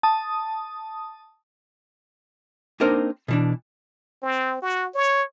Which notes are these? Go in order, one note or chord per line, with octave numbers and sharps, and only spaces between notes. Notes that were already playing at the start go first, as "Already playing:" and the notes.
A5 D#6
A#3 C4 D4 D#4 A#4 C5
B2 E3 D4
C4
F#4
C#5